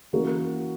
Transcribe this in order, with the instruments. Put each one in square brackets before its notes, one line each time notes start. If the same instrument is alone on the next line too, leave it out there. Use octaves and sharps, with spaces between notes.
[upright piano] E3 A#3 C#4 F#4 A#4